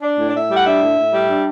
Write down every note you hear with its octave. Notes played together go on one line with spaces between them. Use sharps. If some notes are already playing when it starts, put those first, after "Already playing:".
D4 D5
A2
D5
A2 E5
G3
F#5
D4 E5
A2
A2
G3
D4